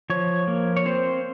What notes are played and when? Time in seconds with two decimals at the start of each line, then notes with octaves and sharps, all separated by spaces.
0.10 F3 C#5
0.48 A#3
0.77 C#5
0.86 C4 C5